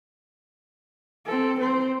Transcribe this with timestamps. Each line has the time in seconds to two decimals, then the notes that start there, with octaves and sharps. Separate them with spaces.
1.26 C4 A4
1.59 C4 C5